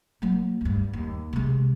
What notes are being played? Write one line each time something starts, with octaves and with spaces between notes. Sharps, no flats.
F#3 A#3
D2 G2
D#2
C3 G#3